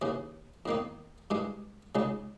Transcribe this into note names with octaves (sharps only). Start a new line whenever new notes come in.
D#2 C#3 E3
E2 D#3 A#3 D#4
G2 E3 G#3
C#2 C#3 G#3 D#4